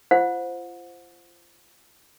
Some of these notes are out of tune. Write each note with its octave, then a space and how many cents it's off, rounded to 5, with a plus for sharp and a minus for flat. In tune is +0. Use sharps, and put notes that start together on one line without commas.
F4 -35 C5 +0 F#5 -40